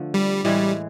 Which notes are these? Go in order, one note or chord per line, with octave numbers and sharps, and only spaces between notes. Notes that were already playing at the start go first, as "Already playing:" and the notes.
Already playing: D3 F3 A3
G3
A2 E3 G3 G#3